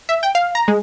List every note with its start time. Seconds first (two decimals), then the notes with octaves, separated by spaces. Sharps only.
0.09 E5
0.23 G5
0.35 F5
0.55 A#5
0.68 G#3